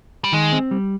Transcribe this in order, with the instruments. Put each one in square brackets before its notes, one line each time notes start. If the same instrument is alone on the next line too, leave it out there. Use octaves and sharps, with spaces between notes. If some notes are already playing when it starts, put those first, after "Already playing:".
[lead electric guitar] G3
[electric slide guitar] D#3 [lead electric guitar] G#3
[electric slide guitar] C4
G3